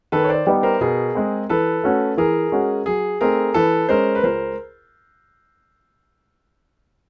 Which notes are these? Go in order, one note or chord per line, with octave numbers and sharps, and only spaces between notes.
D#3 A4 B4
C#5
C5 D5
G3 B3 D#4 G4
A#4 C5
B2 G#4 A#4
G#3 C4
E3 A4 B4
A3 C#4 F#4
E3 G#4 A#4
G#3 C#4 F#4
F#3 G#4
A3 C4 D#4 G#4 A#4
E3 A4 B4
G#3 C#4 A#4 C5
B4
C#2 A#4 C5